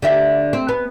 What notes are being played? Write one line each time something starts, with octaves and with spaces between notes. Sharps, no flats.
D3 G4 E5
C4
B3